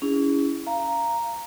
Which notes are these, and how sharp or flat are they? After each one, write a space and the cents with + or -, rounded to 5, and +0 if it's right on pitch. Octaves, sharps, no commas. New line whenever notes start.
C#4 +25 E4 +0 G#4 -20
F5 -25 A#5 +0